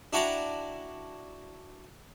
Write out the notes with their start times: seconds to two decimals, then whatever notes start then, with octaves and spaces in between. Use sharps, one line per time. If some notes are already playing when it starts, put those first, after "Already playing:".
0.13 D4 E4 F#4 G5 A#5 D6